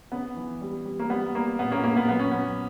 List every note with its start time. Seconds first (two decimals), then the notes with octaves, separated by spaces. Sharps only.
0.12 C#3 B3
0.36 E3
0.61 G3
0.85 G3
1.00 A#3
1.10 G3 B3
1.35 G3 A#3
1.59 A#2 B3
1.71 A#3 C#4
1.83 A#2 A#3
1.96 B3
2.08 F#3 B3
2.19 C#4
2.31 F#3 B3